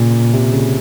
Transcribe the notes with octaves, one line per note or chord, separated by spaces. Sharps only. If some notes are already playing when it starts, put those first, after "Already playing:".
Already playing: A#2 C#3
C3
C#3